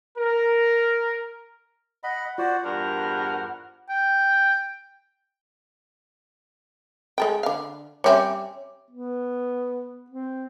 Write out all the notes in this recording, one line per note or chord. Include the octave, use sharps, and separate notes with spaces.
A#4
D#5 F#5 B5
F4 F#4 C5 D5
E2 G2 A#4 C5
G5
G#3 A4 G5
D3 F5
G3 C4 C#4 C#5 E5 D6
B3
C4